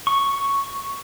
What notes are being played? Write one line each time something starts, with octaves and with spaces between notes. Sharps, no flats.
C#6